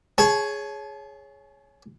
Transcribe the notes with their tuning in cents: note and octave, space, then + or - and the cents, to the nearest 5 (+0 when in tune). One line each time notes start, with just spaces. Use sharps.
G#4 +5 C#5 +0 A5 -35